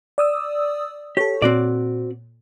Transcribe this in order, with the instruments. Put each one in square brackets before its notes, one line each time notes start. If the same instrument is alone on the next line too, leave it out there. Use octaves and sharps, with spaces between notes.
[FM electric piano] D5 D#6 E6
[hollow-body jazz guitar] G4 [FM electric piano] A4 C#5
[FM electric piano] A#2 [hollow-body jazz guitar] C4 F#4 D5